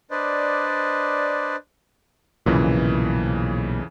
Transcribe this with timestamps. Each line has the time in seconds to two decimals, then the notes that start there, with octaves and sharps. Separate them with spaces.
0.11 D4 B4 C5 D5 D#5
2.46 B1 F2 A#2 C#3 E3